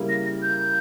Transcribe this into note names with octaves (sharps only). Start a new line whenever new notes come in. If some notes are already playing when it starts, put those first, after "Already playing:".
Already playing: C#3 G3 A#3 E4
A#6
A#6
G6